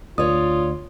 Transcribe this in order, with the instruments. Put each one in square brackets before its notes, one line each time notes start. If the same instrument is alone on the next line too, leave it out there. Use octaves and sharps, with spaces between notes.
[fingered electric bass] D2 [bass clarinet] F4 [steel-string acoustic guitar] C#5 D5 [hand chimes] D#6